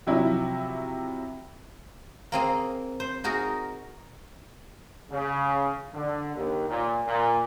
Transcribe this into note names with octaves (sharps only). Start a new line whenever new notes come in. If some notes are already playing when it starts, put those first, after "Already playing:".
C3 F3 F#3 E4
A#3 C4 G#4
C5
D#4 F#4 G#4 A#4
C#3
D3
D#2
A#2
A#2